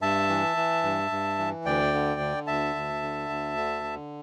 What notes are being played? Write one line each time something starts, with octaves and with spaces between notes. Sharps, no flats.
G2 E5 A5
E3
E3
G2
G2
E3
D2 D5 G5
D3
D3
D2 E5 A5
D2
D3
D2
D3
D3